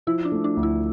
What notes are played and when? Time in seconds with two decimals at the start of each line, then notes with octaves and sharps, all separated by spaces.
0.07 F3 E4
0.25 D4
0.32 A3
0.44 D4
0.57 D2
0.63 E4